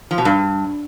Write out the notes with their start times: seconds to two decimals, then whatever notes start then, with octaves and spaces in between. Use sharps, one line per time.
0.11 F3
0.18 B2
0.25 G2